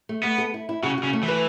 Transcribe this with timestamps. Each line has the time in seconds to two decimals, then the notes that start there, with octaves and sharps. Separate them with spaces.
0.09 A3
0.23 A3 B3
0.38 A4
0.54 E4
0.69 E4
0.83 C#3 F#4
0.98 F#4
1.03 C#3
1.13 A3
1.23 E3
1.28 B4